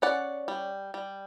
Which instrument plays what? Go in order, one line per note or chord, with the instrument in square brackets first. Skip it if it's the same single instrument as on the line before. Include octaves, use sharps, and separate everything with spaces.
[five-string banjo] C#4 D5 F#5
G3
G3